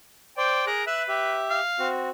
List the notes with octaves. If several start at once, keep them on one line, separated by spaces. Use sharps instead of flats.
C5 D5 G5
G#4 A#4 F#6
B4 E5 E6 F#6
G4 E5
F5
C4 F#4